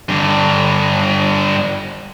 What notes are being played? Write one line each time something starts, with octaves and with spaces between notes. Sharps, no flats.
G2 D3